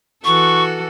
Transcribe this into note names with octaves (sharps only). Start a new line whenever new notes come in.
E3 F#4 A4 C#6